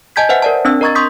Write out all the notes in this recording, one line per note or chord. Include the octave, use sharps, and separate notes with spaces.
D#5 G#5 A5 G6 G#6 B6
B4 C5 E5 F#5
A#4 D5 A5
C4 D4 E6
A#4 D#5 A#5 C#6 G#6 A6
C6 C#6 D#6 G6 B6